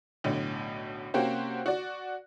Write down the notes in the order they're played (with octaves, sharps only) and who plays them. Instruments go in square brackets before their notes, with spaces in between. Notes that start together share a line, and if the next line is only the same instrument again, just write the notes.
[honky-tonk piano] B1 A2 D3
C3 A#3 C#4 F#4 G4 C5
F#4 D5